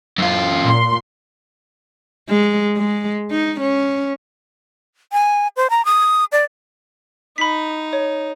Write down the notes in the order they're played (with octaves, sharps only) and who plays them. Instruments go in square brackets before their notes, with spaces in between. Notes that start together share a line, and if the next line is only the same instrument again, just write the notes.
[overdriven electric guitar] F#2 F4
[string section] A#2 C6
[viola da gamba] G#3
G#3
D#4
C#4
[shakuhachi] G#5
C5
A#5
D#6
D5
[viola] D#4 [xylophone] B5 B6
[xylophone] C#5